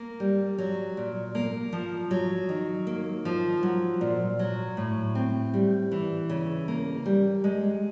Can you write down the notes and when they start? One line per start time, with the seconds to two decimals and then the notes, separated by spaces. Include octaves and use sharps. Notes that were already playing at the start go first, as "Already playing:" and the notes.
Already playing: A#3
0.20 G3
0.58 F#3
0.97 A#2
1.35 A#3
1.73 F3
2.11 F#3
2.49 D#3
2.87 A#3
3.25 F3
3.63 F#3
4.01 A#2
4.39 F#3
4.77 A2
5.15 C4
5.53 G3
5.92 E3
6.29 C#3
6.68 A#3
7.06 G3
7.44 G#3